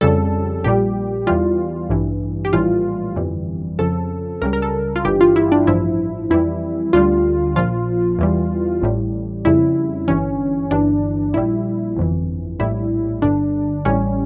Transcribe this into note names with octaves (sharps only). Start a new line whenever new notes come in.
F2 C#3 G3 A4
A#1 A#2 G3 G4
E2 E3 G3 F4
A1 G2 E3
G4
A#1 A2 E3 G3 F4
G1 F2 E3 G3
F2 C#3 F3 A4
C#2 C#3 G3 A#4
A#4
A4
F4
G1 G2 E3 G3 G4
F4
E4
D4
A1 G2 F3 E4
F2 E3 G3 E4
D2 D3 G3 F4
A#1 A#2 F3 F4
E2 E3 G3
A1 A2 G3
F2 C#3 G3 E4
G1 G2 E3 C#4
G1 G2 E3 D4
A#1 A#2 G3 E4
G1 F2 E3
A#1 A2 G3 E4
G1 G2 D3 D4
A1 A2 G3 C#4